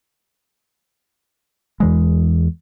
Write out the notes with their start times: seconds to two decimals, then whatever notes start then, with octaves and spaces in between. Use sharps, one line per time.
1.80 E2 E3 G#3